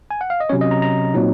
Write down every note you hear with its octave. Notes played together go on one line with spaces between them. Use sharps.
G#5
F#5
F5
D#5
C3 F#3 C#4 C#5
D#5
A#5
A#5
A#2 F#3 C4 D#4